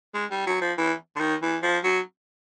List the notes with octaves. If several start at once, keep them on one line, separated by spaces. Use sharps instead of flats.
G#3
G3
F#3
F3
E3
D3
D#3
E3
F3
F#3